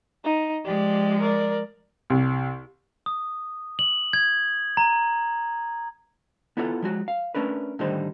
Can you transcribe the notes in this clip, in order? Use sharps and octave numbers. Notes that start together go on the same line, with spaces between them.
D#4
F3 G#3 G4 D5
A#4 D5
C2
D#6
F#7
G#6
A#5
B3 E4 F4 A4 E5 F#5
F3 G#3 F#4
F5
A3 C#4 D4 A#4 B4
A2 D3 D#3 G3 D#4 C5